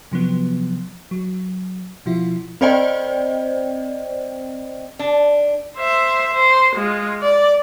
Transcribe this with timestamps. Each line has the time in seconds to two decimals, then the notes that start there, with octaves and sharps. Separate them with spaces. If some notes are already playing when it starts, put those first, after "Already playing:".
0.12 C3 F3 F#3 B3
1.11 F#3
2.06 B2 F3 E4 F4
2.61 C4 C5 D5 D#5 G5
4.99 D4
5.77 C5 E5
6.34 C5
6.76 G#3 F4
7.22 D5